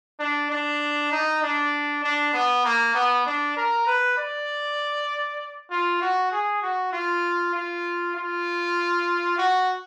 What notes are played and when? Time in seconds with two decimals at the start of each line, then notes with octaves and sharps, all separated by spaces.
0.19 D4
0.50 D4
1.11 D#4
1.42 D4
2.03 D4
2.33 B3
2.65 A#3
2.95 B3
3.26 D4
3.56 A#4
3.87 B4
4.17 D5
5.70 F4
6.01 F#4
6.31 G#4
6.62 F#4
6.92 F4
7.54 F4
8.15 F4
9.38 F#4